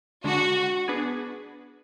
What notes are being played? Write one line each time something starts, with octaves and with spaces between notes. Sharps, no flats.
D3 G#3 D4 F#4
B3 D4 G#4 B4